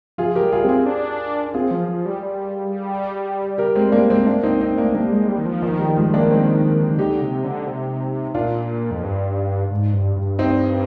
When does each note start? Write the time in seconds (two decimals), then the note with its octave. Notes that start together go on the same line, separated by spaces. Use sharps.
0.18 F3 F4 G#4
0.35 G4 A#4
0.42 G3
0.52 F4 G#4
0.64 C4 F4 G#4
0.86 D4
1.54 C4 F4 G#4
1.71 F3
1.88 F3
2.06 G3
2.22 G3
3.58 G4 A#4
3.75 G#3 C4
3.92 A#3 D4
4.10 G#3 C4
4.27 A#3 D4
4.43 C4 D#4
4.61 C4 D#4
4.78 A#3 D4
4.94 G3 A#3 D4
5.11 G#3
5.28 G3
5.38 D#3
5.46 F3
5.62 D#3 F3
5.79 G3
5.97 F3 G#3
6.14 A#3 D4
6.30 G#3 C4
6.90 D#3
6.98 D3 D#4 G4
7.21 C3
7.44 D3
7.67 C3
8.34 A#2 D4 F4
8.91 F2
9.03 G2
9.71 G#2
9.93 G2
10.16 G2
10.39 C4 D#4